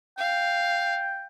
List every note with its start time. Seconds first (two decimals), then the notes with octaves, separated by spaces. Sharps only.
0.18 F5 G5